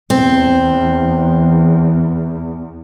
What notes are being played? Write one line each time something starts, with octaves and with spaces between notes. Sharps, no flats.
E2 C4